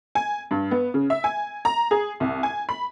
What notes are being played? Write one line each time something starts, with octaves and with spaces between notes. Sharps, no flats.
G#5
G2
B3
C#3
E5
G#5
A#5
G#4
C2
G#5
B5